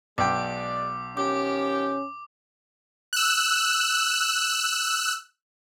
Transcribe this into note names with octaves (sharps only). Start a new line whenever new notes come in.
B1 G#3 D5 G5 D6
D#3 F3 C#4 G4 D6
E6 F#6